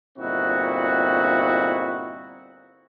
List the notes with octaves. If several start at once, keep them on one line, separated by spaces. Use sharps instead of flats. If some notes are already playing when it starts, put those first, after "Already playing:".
G1 A#2 C4 D#4 E4 F#4